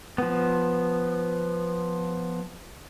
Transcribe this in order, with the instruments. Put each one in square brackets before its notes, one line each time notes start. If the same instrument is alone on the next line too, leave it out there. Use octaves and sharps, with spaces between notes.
[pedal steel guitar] F3 B3